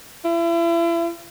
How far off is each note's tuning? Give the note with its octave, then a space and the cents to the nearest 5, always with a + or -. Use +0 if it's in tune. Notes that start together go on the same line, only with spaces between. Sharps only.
E4 +40